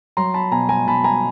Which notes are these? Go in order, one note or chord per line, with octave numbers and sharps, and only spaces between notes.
F#3 A#5 C6
A5 B5
B2 G#5 A#5
G#5 A#5
B2 A5 B5
G#5 A#5